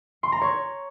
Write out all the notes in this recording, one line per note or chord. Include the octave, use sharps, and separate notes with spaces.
C6
A#5
C#5